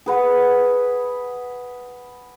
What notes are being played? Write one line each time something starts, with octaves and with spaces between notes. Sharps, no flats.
G#4 B4 F#5